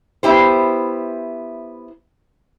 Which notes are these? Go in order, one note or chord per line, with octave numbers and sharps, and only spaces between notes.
B3 E4 G4 C5